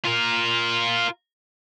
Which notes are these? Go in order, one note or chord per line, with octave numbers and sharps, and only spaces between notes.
F4 A#4